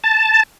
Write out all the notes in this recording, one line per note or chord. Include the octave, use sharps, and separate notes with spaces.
A5